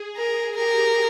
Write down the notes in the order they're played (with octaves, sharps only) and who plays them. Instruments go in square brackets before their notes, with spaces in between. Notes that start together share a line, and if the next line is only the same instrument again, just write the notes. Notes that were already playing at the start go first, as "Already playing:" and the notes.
Already playing: [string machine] G#4
[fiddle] A#4
[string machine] G4 [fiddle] A#4